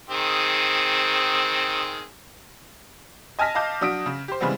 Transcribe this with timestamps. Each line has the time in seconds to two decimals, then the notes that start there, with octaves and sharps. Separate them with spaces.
0.10 D#3 C4 G#4
3.39 D#5 G#5 A5 F6 A#6 B6
3.55 D#5 F5 A5 D6 G6
3.81 F#3 D4 D#6 B6 D7
4.06 C#3
4.28 G4 C5
4.41 C#3 E3 G3 G#3 B3 C4